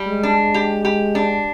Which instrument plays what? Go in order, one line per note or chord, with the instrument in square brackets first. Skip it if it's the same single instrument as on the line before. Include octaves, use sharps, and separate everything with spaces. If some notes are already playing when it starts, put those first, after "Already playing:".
Already playing: [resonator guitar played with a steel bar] G3
[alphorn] G#3
[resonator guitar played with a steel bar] D4
G4
G4
D4